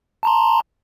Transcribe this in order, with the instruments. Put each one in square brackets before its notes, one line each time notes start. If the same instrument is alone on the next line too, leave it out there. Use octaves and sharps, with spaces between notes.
[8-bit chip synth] A5 A#5 C6